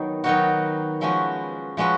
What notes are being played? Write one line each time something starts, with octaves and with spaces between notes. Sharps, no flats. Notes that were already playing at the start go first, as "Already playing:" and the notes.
Already playing: D#3 F#3 B3 D#4
D#3 F#3 B3 D#4 F#4
F3 G#3 C#4 F#4 B4
F3 G#3 C#4 F#4 B4